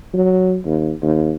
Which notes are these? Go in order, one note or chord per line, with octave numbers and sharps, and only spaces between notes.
F#3
D#2
D#2